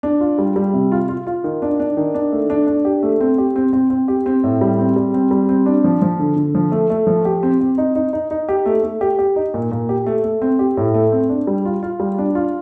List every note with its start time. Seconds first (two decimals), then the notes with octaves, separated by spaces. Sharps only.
0.03 D4
0.21 F4
0.38 G3
0.56 G3
0.73 C3
0.92 F4
1.09 F4
1.27 F4
1.44 D#3
1.62 D4
1.80 D4
1.97 D#3
2.15 D4
2.32 A3
2.50 D4
2.67 D4
2.85 G4
3.03 A3
3.21 C4
3.38 G4
3.56 C4
3.73 C4
3.90 C4
4.08 G4
4.26 C4
4.43 A2
4.61 G3
4.79 C4
4.96 G3
5.14 C4
5.31 G3
5.49 C4
5.66 D4
5.84 F3
6.02 F3
6.19 D3
6.36 D3
6.55 F3
6.72 A3
6.90 A3
7.07 F3
7.25 G4
7.43 C4
7.60 C4
7.78 D#4
7.95 D#4
8.13 D#4
8.31 D#4
8.49 G4
8.66 A3
8.84 A3
9.01 G4
9.19 G4
9.36 D#4
9.54 A#2
9.71 A#2
9.89 G4
10.06 A3
10.24 A3
10.42 C4
10.59 G4
10.77 A2
10.94 A3
11.12 C4
11.29 D4
11.47 G3
11.65 F4
11.83 F4
12.00 G3
12.18 D4
12.35 F4